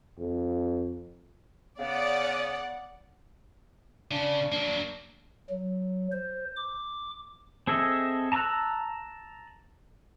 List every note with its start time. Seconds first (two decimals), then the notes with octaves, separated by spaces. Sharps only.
0.18 F2
1.79 C#3 B3 D5 F#5
4.11 C#3 D4
4.52 F#3 A#3 D4
5.50 F#3
6.12 C5
6.57 D6
7.67 C4 G#4 A4 D#5 E5
8.32 A5 A#5 C#6 E6 F#6